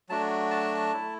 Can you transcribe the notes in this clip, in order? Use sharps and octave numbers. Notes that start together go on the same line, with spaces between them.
F#3 A3 D4 F#4 A5
A5
A3 E4